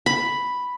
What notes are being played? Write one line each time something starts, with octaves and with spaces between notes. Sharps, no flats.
B5